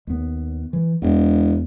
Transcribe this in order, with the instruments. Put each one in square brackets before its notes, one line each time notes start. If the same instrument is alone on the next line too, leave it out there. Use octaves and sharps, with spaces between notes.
[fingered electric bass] D#2 B3
E3
[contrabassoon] E1 [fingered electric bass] E2